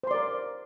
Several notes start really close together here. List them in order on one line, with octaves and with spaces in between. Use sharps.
C5 C6 D5 A#4